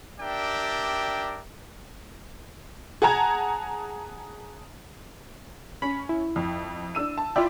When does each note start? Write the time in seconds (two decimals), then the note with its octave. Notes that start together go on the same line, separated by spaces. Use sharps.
0.20 D4 G4 A#4 D5 E5 G5
3.02 G#4 F#5 A5 A#5 G#6
5.82 C#4 B5
6.09 E4
6.36 F2
6.95 D4 E6 D#7
7.18 A5
7.36 E4 F4 D5 E5 G5